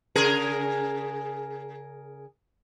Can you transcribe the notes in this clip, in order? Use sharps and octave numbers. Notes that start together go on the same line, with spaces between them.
C#3 G#4 A#4